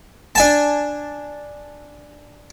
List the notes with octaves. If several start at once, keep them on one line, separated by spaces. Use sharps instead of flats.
D4 G#5 A5